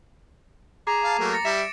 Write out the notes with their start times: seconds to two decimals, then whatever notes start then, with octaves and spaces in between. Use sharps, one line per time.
0.87 G#4 A#5 D6
1.04 F5 A5
1.19 F#3 A3 A#3
1.33 A6 A#6 C#7
1.45 G3 E5 E7
1.58 D7